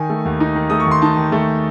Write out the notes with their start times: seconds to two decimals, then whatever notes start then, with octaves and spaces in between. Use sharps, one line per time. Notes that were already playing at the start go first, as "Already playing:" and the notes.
Already playing: D#3 D#4 G#5
0.09 A3
0.25 D#2
0.40 D#4
0.56 D#3
0.70 A3 D#6
0.80 C#6
0.86 D#2 C6
1.02 D#4 A5
1.17 D#3
1.32 A3